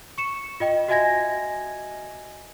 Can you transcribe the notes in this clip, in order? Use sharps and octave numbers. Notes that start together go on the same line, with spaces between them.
C#6 C#7 E7
F4 D#5 G5
F#4 D#5 E5 G#5 G#6 A#6